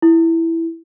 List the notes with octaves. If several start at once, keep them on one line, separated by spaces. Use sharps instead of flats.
E4